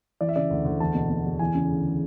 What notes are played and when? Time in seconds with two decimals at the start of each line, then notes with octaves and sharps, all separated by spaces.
0.21 E3 D5
0.29 E5
0.36 C#3 D5
0.50 D2
0.65 D2
0.80 E2 A5
0.95 B2
1.10 B2
1.25 E2
1.39 E3 G#5
1.55 C#3
1.70 D2